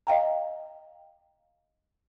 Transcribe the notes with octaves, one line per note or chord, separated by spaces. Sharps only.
D#5 F5 G5 A#5